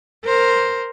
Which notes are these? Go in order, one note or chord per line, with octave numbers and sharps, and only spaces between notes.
A#4 C5